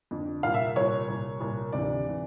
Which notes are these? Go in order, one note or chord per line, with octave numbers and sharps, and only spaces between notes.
F2 D3
C2 A#2 F5
E5
C2 A#2 C#5
C2 A#2
C2 A#2
D2 C3 E3 D5
C3 E3